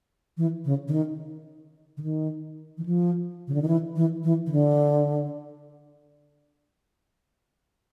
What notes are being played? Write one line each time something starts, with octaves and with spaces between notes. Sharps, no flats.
E3
C#3
D3
D#3
D3
D#3
E3
F3
C#3
D3
D#3
E3
E3
E3
D#3
D3